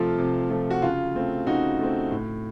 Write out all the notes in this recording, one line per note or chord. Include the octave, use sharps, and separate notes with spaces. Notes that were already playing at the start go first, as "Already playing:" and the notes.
Already playing: C3 F3 A3 F4 A4
C3
F3 A3
F#4
C#3 F4
A3 C4
C#3 D#4 F#4
A3 C4
A2